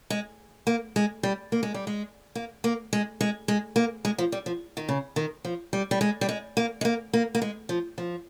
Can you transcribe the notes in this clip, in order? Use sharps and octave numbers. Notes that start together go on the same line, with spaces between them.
G#3
A#3
G#3
G3
A#3
G#3
G3
G#3
A#3
A#3
G#3
G#3
G#3
A#3
G#3
F3
G3
F3
D#3
C#3
D#3
F3
G3
G3
G#3
G3
G#3
A#3
G#3
A#3
A#3
A#3
G#3
F3
F3